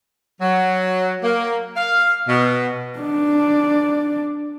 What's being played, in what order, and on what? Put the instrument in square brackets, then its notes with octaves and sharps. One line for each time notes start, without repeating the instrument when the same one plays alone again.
[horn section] F#3
A#3
F5
B2
[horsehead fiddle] D4 D5